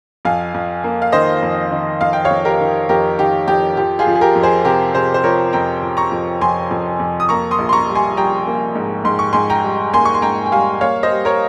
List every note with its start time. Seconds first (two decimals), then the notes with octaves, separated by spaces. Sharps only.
0.25 F2 F5 G#5
0.54 F2
0.84 A#3
1.02 F5
1.12 D#3 C5 D#5
1.43 F2
1.72 D#3
2.01 F2 F5
2.13 G5
2.25 C#5 F5
2.30 F2
2.45 G4 A#4
2.60 D#3
2.89 F2 G4 A#4
3.19 D#3 G4
3.48 F2 G4
3.77 F3 G4
3.99 F4 G#4
4.07 F3
4.15 G#4
4.21 G4 A#4
4.35 F2
4.43 G#4 C5
4.65 C3 G4 A#4
4.94 C3 G#4 C5
5.14 C5
5.24 F3 A#4 C#5
5.53 F2 G5 A#5
5.83 F3
5.97 A#5 C#6
6.12 F2
6.41 F2 G#5 C6
6.71 F2
6.99 F2
7.20 D#6
7.29 A#3 A#5 C#6
7.51 C6 D#6
7.59 A#1
7.69 C6
7.73 A#5 C#6
7.88 G3
7.95 G#5 C6
8.17 G3 G5 A#5
8.47 A#3
8.76 G#2
9.05 G#2 C6
9.19 C#6
9.33 G#2 G#5 C6
9.50 G5 A#5
9.64 G3
9.93 A#3 G#5 C6
10.05 C#6
10.14 C6
10.22 G#2 G5 A#5
10.46 G5
10.52 G3 F5 G#5
10.81 A#3 C#5 F5
11.03 C5 D#5
11.11 G3
11.25 A#4 C#5